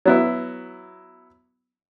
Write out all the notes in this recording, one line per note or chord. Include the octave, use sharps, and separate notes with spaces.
F#3 B3 E4